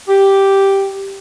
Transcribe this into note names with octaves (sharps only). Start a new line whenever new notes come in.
G4